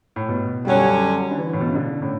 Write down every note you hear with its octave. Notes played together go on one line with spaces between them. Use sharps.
A2
B2
F#2 D3 F#3 G3 C#4
D3
E3
A2
B2
C#3
D3
A2